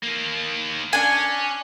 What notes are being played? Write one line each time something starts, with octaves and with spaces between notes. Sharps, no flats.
D#3 A#3
C#4 D4 G#5